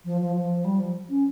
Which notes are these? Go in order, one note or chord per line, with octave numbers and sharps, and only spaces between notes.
F3
F3
F3
G3
F3
C#4